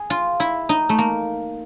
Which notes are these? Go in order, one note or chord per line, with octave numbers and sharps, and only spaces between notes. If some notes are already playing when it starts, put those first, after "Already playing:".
Already playing: G#4
F4
E4
D#4
A3
A#3